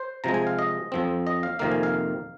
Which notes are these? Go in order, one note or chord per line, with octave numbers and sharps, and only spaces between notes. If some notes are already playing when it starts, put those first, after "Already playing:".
Already playing: C5
C3 F3 G#3 A#5
G#5
F5
D#5
F2 F3 C4
D#5
F5
F2 C3 D#3 A#3 F5
G#5
F5